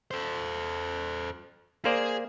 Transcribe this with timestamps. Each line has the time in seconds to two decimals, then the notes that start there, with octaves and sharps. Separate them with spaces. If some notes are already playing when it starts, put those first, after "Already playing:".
0.11 A4 C5
1.85 A#3 G#4 C5 D5